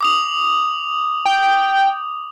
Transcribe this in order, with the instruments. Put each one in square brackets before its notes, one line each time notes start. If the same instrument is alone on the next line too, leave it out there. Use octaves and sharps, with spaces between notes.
[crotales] D6 D#6 F7
[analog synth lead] G5